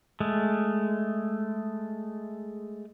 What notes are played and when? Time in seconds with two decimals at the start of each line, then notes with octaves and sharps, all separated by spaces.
0.20 G#3 A3